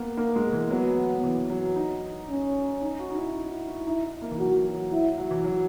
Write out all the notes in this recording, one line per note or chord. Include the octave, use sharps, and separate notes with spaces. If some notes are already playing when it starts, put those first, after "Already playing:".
Already playing: A#3 B3
A#3
G#3
E3
F#3 B3
E3
F#3
D#4
C#4
D#4
F#4
D#4
E4
D#4
E4
E4
D#4 E4
A#3
E3
F#3 F#4
F#3
F#3
F#3 E4
F#3
E3
F#3